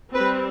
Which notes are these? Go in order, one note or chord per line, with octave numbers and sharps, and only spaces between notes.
G3 C4 B4